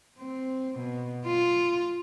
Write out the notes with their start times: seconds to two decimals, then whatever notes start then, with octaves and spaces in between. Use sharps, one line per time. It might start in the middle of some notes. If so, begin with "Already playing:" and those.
0.19 C4
0.79 B2
1.26 F4